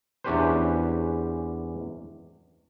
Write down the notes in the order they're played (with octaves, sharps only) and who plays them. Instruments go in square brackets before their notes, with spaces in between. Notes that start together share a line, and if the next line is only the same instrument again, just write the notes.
[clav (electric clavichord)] E2 C#4 D4 G4 B4 C5